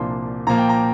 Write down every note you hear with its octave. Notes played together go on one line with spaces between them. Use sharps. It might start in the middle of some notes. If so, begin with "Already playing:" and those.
Already playing: C2 A#2 F3 A#3 D4 C6
A#2 F3 A#3 A#5
G5
A#5